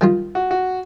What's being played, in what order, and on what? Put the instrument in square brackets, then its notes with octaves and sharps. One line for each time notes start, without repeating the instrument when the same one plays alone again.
[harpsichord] D#3 G3 F4
[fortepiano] F#4
F#4